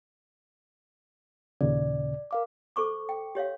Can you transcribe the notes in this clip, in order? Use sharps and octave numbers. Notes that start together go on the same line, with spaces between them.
D#2 A#2 C#3 D5
A#4 F5 D6
A4 C5 C#6 D6
G5
G4 C#5 E5 F5